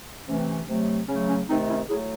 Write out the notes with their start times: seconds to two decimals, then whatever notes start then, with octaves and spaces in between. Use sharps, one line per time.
0.28 C3 E3 A3 C#4
0.38 C4
0.49 C#4
0.68 C3 F#3 A3
1.08 C#3 F#3 A3 C#4
1.29 C#4
1.49 C3 D#3 A3 C4 D#4
1.69 C#4 E4
1.89 A2 F#3 A3 E4 G#4